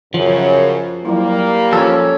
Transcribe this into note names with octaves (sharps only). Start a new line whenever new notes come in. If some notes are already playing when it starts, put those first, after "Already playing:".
F#2 C#3 F3
F#3 G3 A#3 E4
F3 C#4 F4 A4 C6